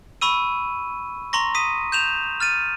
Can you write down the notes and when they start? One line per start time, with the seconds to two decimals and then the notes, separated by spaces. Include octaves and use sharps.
0.21 B5 C#6 E6 D#7
1.33 A#5 C6 C#6 A#6
1.55 D#6 B6 D#7
1.92 G6 E7 F7
2.40 F6 A6 D#7